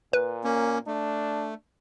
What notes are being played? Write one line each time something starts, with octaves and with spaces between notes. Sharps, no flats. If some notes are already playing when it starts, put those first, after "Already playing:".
A#2 B4
A#3 C#4
A3 D4